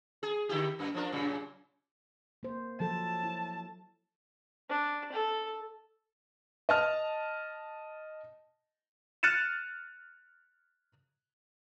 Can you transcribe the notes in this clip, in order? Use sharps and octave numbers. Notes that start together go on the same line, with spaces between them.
G#4
D3 E4 G4
F#2 A#3
F3 D4 A#4
F#2 A#2 C#3
A#3 C5
F3 F#3 A4 A5
E4
D4
A4
D#5 A5 F6
F6 F#6 A6 C#7 D#7 E7